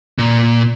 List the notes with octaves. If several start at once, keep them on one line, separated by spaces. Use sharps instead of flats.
A#2